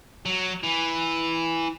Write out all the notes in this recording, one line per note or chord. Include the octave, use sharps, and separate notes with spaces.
F#3
E3